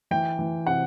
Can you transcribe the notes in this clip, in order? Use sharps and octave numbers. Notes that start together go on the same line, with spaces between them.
E3 G5
E3
C3 F#5